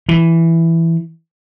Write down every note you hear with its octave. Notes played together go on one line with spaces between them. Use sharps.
E3